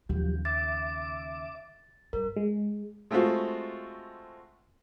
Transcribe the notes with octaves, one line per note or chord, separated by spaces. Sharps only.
D#2 C#3 F3 F#3 G4
E5 D6 A6
G2 A#4
G#3
G#3 A3 C4 F4 F#4